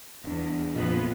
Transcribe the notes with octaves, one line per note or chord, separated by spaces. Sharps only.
D#1 E2 D4
G#1 F2 A#2 B3